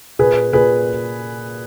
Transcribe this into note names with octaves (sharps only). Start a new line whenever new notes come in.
A#2 G#4 B4
A#2 G#4 B4